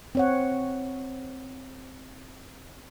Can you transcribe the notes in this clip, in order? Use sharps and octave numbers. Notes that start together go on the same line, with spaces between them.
C4 C#5 F#5